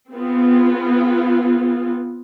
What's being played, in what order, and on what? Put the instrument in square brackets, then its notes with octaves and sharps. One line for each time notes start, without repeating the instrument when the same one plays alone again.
[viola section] B3 C4 F4 G#4